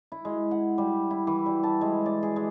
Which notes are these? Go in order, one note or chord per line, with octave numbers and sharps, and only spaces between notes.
E4
G#3
F#5
G3
E4
E3
G3
A5
G#3
D5
G#4
G#3